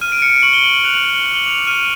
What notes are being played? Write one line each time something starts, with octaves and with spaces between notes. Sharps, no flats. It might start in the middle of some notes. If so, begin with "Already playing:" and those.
F6 D#7
D7
F6 C#7
D7
C#6 F#7
G7
C#6 F#7
F#7
F#6 F7
F#7
F#6 F7
F#7
D6 G7
F#7
D6 F7
F6 D#7